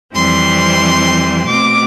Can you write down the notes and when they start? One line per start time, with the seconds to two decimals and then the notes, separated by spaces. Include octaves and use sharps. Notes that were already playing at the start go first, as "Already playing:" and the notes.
0.14 F2 E3 G3 C4 C6
1.46 B2 A3 C4 D6